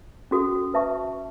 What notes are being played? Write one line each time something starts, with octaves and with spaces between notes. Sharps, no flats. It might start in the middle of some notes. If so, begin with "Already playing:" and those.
C#4 F#4 A4
B4 E5 A5 C#6